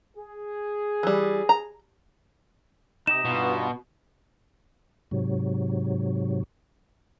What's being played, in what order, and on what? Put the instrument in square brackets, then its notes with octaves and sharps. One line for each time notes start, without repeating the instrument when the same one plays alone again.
[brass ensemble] G#4
[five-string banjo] E3 G3
A#5
[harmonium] C3 [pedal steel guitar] D#4 G4 D#5 [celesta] E7
[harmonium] G2 B3 F4 [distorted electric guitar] B2
[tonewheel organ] G#2 C3 F#3